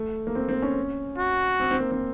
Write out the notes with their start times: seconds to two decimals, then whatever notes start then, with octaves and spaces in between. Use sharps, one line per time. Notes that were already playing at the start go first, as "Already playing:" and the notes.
Already playing: A3
0.27 A#3
0.35 C4
0.49 C4
0.62 C#4
1.19 F#4
1.60 C4
1.71 C4
1.80 A#3
1.92 C4